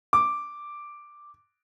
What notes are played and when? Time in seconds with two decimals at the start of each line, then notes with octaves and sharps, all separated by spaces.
0.13 D6